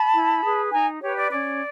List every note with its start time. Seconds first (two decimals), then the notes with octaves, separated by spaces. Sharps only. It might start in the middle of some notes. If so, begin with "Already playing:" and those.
Already playing: A5 B5
0.14 E4
0.44 G#4 B4
0.73 D#4 G#5 A#5
1.01 G4 B4 C#5
1.16 D5
1.31 C#4 D5